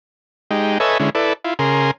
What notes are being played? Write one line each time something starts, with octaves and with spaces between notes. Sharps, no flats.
G#3 D#4 G4
A4 B4 C#5 D#5 E5 G#5
D3 G#3 C#4 E4
E4 A4 B4 D5
E4 F4
C#3 G#4 A#4 C6